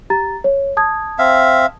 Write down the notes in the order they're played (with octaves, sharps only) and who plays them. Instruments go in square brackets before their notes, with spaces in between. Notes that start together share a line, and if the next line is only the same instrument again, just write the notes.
[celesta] G4 A#5 A6
C#5
A5 D#6 G#6
[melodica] C4 E5 F5